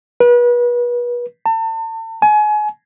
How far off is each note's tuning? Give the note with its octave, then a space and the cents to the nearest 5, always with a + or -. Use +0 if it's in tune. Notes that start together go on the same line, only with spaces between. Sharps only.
B4 -35
A5 +35
G#5 +30